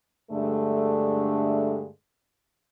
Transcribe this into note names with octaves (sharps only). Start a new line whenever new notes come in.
G2 D3 G#3 A3